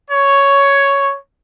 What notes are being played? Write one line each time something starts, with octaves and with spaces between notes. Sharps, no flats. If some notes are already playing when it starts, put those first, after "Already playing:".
C#5